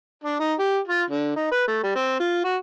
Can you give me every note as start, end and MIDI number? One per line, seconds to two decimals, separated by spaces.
0.24 0.38 62
0.40 0.53 63
0.59 0.78 67
0.88 1.03 65
1.10 1.35 50
1.36 1.49 63
1.51 1.64 71
1.68 1.80 57
1.83 1.94 55
1.95 2.18 60
2.20 2.41 65
2.44 2.57 66